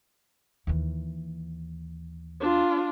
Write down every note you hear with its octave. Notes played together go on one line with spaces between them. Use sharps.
D#2 E3
D4 F4